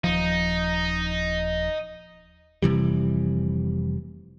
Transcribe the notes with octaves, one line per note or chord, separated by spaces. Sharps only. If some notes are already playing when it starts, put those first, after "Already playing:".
D#1 F3 D#4
F1 C3 E3 G3